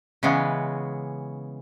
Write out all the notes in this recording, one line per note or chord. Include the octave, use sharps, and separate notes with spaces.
C#3 E3 G#3 B3 C#4